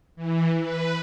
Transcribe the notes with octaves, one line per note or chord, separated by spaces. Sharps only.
E3
B4